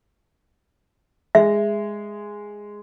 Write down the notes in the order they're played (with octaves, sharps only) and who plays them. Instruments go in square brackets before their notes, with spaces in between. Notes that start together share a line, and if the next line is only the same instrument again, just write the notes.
[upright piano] G#3 [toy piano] E5